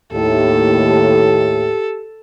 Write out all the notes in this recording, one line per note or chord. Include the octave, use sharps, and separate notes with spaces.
D#2 A2 G4 A4